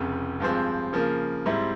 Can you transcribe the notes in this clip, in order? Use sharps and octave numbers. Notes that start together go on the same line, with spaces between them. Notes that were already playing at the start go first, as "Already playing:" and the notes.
Already playing: F1 F2 C#3
G2 F3 G#3 C4
C#3 F3 A#3
G#2 G3 C4 E4